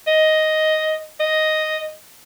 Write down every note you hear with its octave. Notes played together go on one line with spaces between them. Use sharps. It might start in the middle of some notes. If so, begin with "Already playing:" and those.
D#5
D#5